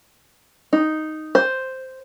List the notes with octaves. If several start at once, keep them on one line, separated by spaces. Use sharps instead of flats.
D#4
C5